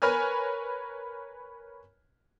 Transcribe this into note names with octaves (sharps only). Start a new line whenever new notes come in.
A#4 B4 C#5 G#5 F6